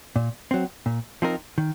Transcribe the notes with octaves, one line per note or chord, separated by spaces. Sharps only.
A#2
F#3 C4
A#2
F3 C4 D#4 A#4
D#3